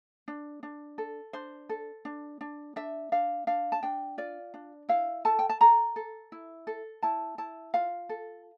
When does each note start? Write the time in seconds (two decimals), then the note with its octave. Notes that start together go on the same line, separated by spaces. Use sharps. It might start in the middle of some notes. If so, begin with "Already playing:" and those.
0.28 D4
0.63 D4
0.98 A4
1.33 D4 C5
1.69 A4
2.05 D4
2.41 D4
2.76 D4 E5
3.12 D4 F5
3.47 D4 F5
3.72 A5
3.83 D4 G5
4.18 F4 D5
4.54 D4
4.89 E4 F5
5.25 A4 A5
5.39 G5
5.49 A5
5.61 A4 A#5
5.96 A4
6.32 E4
6.67 A4
7.02 E4 A5
7.38 E4 A5
7.74 F4 F5
8.09 A4